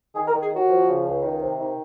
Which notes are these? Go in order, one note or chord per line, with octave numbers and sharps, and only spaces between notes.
D#3 G#4
A#4
D#3
G#4
D#2 F#4
F3
C#3
C#2
D#3
C3
D#3